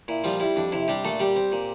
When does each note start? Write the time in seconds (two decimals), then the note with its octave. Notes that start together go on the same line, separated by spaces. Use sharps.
0.08 A#2 E4
0.24 F3 G3 F4
0.40 G3 E4
0.56 F2 D4
0.72 C3 E4
0.88 G3 D4 G4
1.04 A#2 A3 A4
1.20 G3 G4
1.36 C4
1.52 A#2